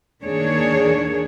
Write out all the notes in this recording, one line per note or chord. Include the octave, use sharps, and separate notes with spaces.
D#2 D#3 A#3 D4 G#4 C#5